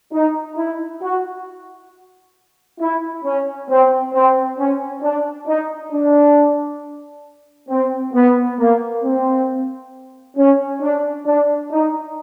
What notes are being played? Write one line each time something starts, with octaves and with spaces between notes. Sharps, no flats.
D#4
E4
F#4
E4
C#4
C4
C4
C#4
D4
D#4
D4
C4
B3
A#3
C4
C#4
D4
D4
D#4